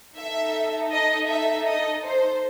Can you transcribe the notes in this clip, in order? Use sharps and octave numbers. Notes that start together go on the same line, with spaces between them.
D#4 A4 E5
D#5
E5
D#5
C5